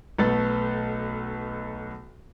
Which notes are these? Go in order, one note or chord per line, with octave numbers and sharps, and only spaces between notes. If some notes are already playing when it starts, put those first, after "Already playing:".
B1 A3 B3 A4 A6